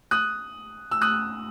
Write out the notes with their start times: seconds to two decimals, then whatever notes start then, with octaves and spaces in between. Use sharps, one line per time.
0.11 D#6 F#6
0.91 E6
1.01 D#6 F#6